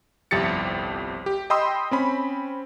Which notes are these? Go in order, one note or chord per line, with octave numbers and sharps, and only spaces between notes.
G1 C2 F2 G4 A6 C#7
G4
D#5 G5 B5 C6 D#6 E6
C4 C#4 B5